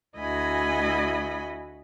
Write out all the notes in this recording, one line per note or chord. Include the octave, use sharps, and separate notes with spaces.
D2 E4 F#4 D#5 G#5 B5